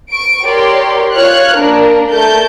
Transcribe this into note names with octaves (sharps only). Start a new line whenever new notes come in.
C#6 D7
G4 A#4 C#5 D5 C6
F4 C#5 F6 F#6
A#3 D4 A#4
A3 A#4 A5 G6